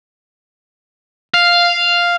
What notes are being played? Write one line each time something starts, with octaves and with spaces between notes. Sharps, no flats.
F5